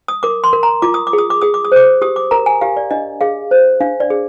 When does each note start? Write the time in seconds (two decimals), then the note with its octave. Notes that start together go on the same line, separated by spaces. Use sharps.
0.08 D#6
0.23 A#4 D6
0.44 C6
0.53 A#4
0.63 A#5
0.82 F4 D6
0.94 D#6
1.07 D6
1.13 G#4
1.18 D#6
1.30 D6
1.42 G#4 D#6
1.54 D6
1.65 D#6
1.72 C5 D6
2.02 G4 D#6
2.16 D6
2.31 A#4 A#5
2.46 G#5
2.61 G4 F5
2.77 D5
2.91 D4 D#5
3.21 G#4 F5
3.51 C5
3.80 D4 F5
4.00 D5
4.10 G#4